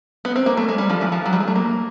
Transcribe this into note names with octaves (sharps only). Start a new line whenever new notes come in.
B3
C4
A#3
A3
G#3
G3
F3
E3
F3
F#3
G3
G#3
A3
A#3